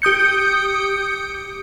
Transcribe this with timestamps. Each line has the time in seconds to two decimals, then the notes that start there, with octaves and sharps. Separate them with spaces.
0.02 G4 D#6 G6 C#7